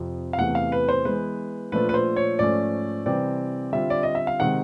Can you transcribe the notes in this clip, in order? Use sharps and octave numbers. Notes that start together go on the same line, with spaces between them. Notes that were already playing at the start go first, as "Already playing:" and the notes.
Already playing: F2 C3 F3
F5
E2 C3 E3 A3 F#5
F5
B4
C5
E3 G#3 B3 B4
A#2 F3 A3 D4 F4 B4
B4
C5
C#5
G#2 F3 A3 C#4 D5
C3 E3 G3 C4 D5
D3 G3 C4 F4 E5
D5
D#5
E5
F5
C3 D#3 G#3 C4 D#4 F#5